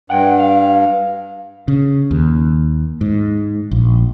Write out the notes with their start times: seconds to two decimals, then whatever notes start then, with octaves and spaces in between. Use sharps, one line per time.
0.10 G2 F#5 G5
0.40 F5
1.68 C#3
2.11 D#2
3.01 G#2
3.71 A#1